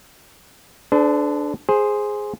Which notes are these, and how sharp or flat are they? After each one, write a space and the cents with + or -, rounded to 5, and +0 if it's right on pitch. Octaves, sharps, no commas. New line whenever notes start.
D4 +0 A4 -40 C5 -45
G#4 +0 C5 +5